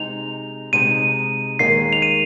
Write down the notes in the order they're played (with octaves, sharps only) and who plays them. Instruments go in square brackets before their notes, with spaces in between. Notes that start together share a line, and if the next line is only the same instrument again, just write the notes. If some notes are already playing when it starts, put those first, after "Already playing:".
Already playing: [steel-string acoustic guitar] C3 G#3 D#4 [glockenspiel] F7
[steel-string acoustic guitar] C3 G#3 D#4 [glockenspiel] D#7
[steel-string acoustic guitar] D#2 D#3 G#3 [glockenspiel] C7
[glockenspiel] F7
D#7